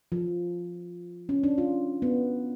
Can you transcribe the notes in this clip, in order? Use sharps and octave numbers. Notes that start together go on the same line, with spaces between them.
F3
C#4
D4
F4
B3